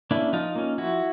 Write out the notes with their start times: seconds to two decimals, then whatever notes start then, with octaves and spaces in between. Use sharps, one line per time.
0.11 A#3 C#4 D4 E4
0.33 F3 D#4 F4
0.56 A#3 C#4
0.78 F3 E4 F#4